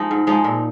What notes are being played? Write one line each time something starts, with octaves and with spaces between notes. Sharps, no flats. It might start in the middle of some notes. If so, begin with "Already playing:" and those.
Already playing: F3 G#3 D#4
G#2
F3 G#3 D#4
A#2